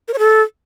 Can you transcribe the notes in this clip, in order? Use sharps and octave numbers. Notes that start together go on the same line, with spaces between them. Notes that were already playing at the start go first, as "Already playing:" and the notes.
A#4
C#5
A4